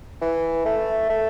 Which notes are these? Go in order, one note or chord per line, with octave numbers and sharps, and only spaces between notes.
E3
A3
A3